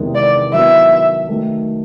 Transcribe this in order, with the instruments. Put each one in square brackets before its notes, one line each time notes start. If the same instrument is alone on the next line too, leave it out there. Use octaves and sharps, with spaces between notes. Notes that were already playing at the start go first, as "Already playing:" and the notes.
Already playing: [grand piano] E2 C3 D#3 G#3
[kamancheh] D5
[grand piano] D#3 F#3 B3 E4 [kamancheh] E5
[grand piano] D#3 F#3 A3